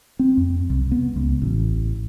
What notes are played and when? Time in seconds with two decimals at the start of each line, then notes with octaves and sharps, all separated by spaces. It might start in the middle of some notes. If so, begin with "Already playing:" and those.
0.19 C4
0.37 F2
0.70 C2
0.92 B3
1.16 C#2
1.42 A1